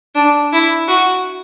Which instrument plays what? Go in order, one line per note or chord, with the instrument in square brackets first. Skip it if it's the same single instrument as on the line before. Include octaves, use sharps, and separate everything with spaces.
[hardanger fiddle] D4
E4
F#4